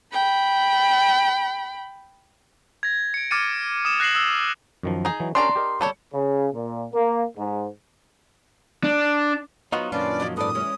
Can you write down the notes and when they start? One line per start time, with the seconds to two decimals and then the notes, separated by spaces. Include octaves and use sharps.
0.13 G5 B5
2.83 G#6 A#6
3.14 C#7 D7
3.31 D6 F6 G#6 A6 C#7 D#7
3.85 D#6 E7
4.00 F#6 A#6 C7 E7 F#7
4.15 D#6 E6 G7
4.83 F#2 D#3 F3
5.05 D#4 G#4
5.20 E3 F#3
5.35 C#4 D4 G4 A#4 D5 A#5 C6
5.56 G4 A#4 D#5
5.81 G3 A4 C#5
6.13 C#3
6.53 A#2
6.94 A#3
7.37 G#2
8.84 D4
9.72 F#3 B3 D#4 F4 F#4 D#5
9.92 F#2 A#2 D#3 C#4 D4 F4 B4 D5
10.20 F3 F#3 D#5
10.37 G#2 A4 B4 D5 D#6
10.55 E3 G#3 C#4